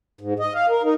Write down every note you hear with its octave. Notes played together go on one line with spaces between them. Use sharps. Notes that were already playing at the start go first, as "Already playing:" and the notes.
G#2
D#5
F5
A#4
D#4